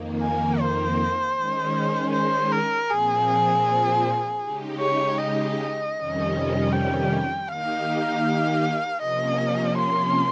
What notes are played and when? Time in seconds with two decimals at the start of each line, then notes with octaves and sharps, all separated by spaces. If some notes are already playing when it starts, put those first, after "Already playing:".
Already playing: F2 D#3 A#3
0.22 G#5
0.60 C5
1.37 D#3 G#3 C#4
2.13 C5
2.52 A#4
2.89 A#2 F3 C4 G#4
4.43 C#3 G#3 D#4 G4
4.80 C#5
5.18 D#5
5.96 F2 C3 D#3 G3 C#4
6.72 G5
7.48 D#3 A#3 D#4 G4 F5
9.00 C3 F3 A#3 C#4 D#5
9.77 C6